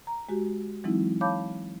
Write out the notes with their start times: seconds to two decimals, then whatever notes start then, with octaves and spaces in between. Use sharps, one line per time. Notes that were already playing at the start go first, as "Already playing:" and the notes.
0.07 A#5
0.29 G#3 F#4 G4
0.84 E3 F#3 G#3 C4 D#4 E4
1.21 C#5 F5 A5 B5 D6 G6